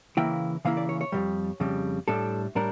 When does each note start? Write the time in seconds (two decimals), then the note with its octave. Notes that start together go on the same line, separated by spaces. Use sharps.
0.17 C#3 E3 A#3 E4 G5
0.65 C#3 E3 A#3 E4 F5
0.77 D5
0.89 C#5
1.01 C#5
1.12 F2 C#3 G3
1.60 F2 C#3 G3
2.08 A2 G3 D4 A4
2.55 A2 G3 D4 A#4